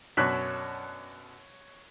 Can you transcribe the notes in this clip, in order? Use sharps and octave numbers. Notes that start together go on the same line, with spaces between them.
F#2 B2 D4 C#5 F#6 B6